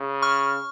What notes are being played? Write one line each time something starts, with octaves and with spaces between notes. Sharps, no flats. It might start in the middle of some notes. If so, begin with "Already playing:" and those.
Already playing: C#3
C#6 F6